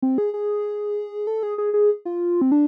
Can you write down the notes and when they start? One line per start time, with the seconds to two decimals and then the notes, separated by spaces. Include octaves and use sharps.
0.02 C4
0.18 G#4
0.34 G#4
1.27 A4
1.43 G#4
1.58 G#4
1.74 G#4
2.05 F4
2.41 C4
2.52 D4